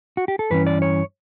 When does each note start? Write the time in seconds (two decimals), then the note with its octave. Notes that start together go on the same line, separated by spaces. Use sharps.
0.17 F#4
0.28 G4
0.39 A4
0.50 G2 E3 C#4 B4
0.67 D5
0.82 C#5